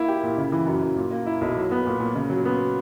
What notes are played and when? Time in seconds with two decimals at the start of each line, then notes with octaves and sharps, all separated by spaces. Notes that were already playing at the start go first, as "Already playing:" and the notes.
Already playing: A#3 E4
0.08 G4
0.23 A#2
0.38 C#3
0.52 E3
0.67 F#2
0.82 F#2
0.96 A#2
1.11 A#3
1.26 E4
1.41 B1
1.57 F#3
1.71 B3
1.86 A#2
2.00 A#2
2.15 C#3
2.30 F#3
2.45 B3